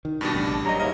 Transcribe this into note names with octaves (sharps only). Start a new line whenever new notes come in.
D#3
G2 B2 G3 D4
A1 C#3
A1
G#1 F#3 G3 D#5 A#5
D#2 G#2 E4 A#4 D#5